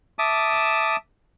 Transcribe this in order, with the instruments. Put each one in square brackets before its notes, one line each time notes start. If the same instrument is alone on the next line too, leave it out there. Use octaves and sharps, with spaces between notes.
[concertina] E5 A5 D6 D#6